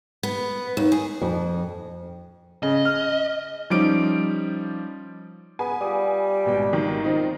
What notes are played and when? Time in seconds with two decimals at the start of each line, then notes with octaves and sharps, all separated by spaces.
0.23 B3
0.77 D#2
0.92 G#4
1.22 F2
2.63 C#3 D#5
2.85 F6
3.70 F3 G3 C#4 D#4 D6 D7
5.59 B3 G#4 G#5
5.81 G3 F4 D#6
6.45 G#1 B2 G5
6.73 D#3
7.04 F3 C4 D#4